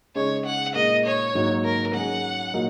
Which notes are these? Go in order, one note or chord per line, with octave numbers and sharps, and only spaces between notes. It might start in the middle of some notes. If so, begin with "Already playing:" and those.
C#3 G#3 D#4 C#5
F#5
A#2 G#3 D#4 A#4 D#5
C#5
G#2 D#3 F#3 A#3 F#4
A#4
D#3 F#3 C#4 G#4 F#5
A#2 F#3 D#4 F#4 A#4